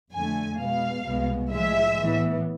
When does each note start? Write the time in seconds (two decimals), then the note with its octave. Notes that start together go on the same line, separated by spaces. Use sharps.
0.13 F2 D3 A3 G#5
0.59 B2 G#3 B3 F5
1.06 C2 B2 G#3 B3
1.52 A2 F3 G#3 E5
1.99 A2 E3 B3